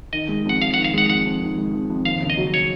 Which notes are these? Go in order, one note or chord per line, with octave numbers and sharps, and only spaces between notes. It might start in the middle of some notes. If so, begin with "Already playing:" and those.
D#3 D#5
G#3
F2 F#5
F2 F5
D#3 F#5
F5
G#3 F#5
F2 F#5
F2
D#3
G#3
F2
F2
D#2 F5
C#3
D#5
F#3
C#5